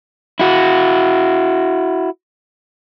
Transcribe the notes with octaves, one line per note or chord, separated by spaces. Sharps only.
E4 F#4